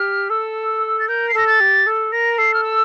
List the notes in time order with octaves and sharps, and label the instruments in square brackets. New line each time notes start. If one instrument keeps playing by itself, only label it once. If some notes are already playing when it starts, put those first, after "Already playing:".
Already playing: [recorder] G4 [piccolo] F6
[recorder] A4 [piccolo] E6
[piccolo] A6
[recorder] A#4 [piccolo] G6
[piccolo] C7
[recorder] A4 [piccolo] A#6
[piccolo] A6
[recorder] G4
A4
[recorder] A#4 [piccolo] A#6
[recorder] A4 [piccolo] C7
[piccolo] F6
E6